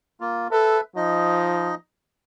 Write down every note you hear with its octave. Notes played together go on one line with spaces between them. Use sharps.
A#3 F4
A4 B4 E5
F3 D#4 D#5